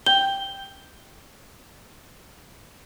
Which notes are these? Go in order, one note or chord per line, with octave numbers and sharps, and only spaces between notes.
G5 G7